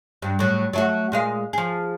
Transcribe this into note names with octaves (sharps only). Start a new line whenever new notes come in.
G2
A2 F#3
F#3 A3 F#4
A#2 G#3 F5
F3 G#4